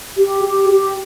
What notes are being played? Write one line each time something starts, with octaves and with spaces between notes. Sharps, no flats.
G4
G4
G4